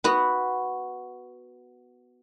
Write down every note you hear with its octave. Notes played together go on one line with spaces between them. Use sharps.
B3 F#4 B4